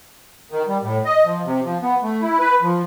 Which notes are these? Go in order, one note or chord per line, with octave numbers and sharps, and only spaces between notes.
D#3
G3
A2
D#5
F3
C3
F3
B3
A3
E4
B4
F3